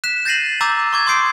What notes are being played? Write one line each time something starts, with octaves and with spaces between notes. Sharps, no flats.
F#6 B6 E7
G6 A6 A#6 C7 D#7 F#7
A#5 D6 E6 G6 A6
C#6 D6 G#6
C6 C#6 D#6 G6 C7 D7